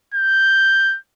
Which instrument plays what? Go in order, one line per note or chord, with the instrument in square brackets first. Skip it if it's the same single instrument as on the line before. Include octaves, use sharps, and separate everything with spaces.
[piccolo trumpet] G6